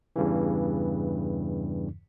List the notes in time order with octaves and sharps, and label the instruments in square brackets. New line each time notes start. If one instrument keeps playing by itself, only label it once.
[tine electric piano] E2 G2 C#3 E3